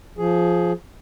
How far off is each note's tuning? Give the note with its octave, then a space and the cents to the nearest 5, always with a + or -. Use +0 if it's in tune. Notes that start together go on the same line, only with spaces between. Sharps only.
F3 -5 G#4 +10